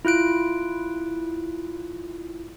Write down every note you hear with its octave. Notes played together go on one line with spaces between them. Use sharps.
E4 F4 F#6 D7